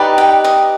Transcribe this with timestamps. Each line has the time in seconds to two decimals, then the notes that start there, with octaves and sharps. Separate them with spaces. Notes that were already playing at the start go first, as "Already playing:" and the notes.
Already playing: D#4 G4 B4 D5
0.18 G5
0.44 D#5